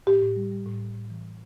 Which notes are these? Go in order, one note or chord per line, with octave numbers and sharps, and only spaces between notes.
A2 G4
A2
G3
G3
A2
A2
A2
E3